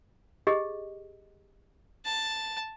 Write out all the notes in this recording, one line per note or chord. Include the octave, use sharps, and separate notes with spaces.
G4 G#4 D#5
A5